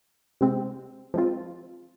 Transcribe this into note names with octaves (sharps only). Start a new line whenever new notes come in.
C3 G#3 C4
F3 G#3 C4 F4